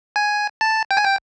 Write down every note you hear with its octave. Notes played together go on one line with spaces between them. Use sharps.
G#5
A5
G5
G#5
G5